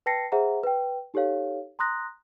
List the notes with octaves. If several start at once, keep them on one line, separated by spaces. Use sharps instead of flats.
B4 G5 A5 A#6 C7 C#7
G#4 C5 E5 F#5 A#5
B4 G5
D#4 G4 A4 C#5 F5
A#5 C6 D#6 F#6 A#6